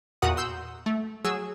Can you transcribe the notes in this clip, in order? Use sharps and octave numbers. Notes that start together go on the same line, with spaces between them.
E2 A#2 F#4 A#4 F#5 D#6
C6 E6 G6
A3
F#3 G#4 E6